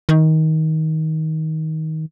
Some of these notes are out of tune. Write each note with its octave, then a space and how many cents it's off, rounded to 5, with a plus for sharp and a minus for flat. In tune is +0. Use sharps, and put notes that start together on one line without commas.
D#3 +20